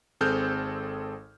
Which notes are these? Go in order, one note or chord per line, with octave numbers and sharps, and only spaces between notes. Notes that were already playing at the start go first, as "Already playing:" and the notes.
G#1 C4 G#4 A4 F6 G6